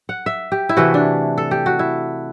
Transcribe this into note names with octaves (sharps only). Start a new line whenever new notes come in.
F#5
E5
G4
E4
C3 E3 A3 F#4
D4
A4
G4
F#4
E4